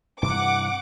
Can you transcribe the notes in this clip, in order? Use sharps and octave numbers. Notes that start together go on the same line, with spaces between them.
G2 C3 E3 F#5 D6